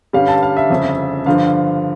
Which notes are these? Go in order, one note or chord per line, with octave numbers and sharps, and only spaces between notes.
G2 D3 G3 C#4 F5
A5
F5
E5
G1 F2 C#3
G2 D3 F3 F5